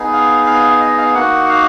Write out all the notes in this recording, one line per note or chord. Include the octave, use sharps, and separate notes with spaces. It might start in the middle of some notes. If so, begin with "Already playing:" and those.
Already playing: B3 D#4 G#4
F5
F5
F5
D#5
F5
A#3 D#4 F#4 F#5
F5